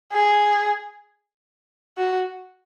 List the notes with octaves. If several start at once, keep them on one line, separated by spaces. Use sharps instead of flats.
G#4
F#4